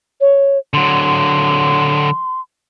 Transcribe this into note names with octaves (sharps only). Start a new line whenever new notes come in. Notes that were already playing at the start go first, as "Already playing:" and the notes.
C#5
D3 F#3 C6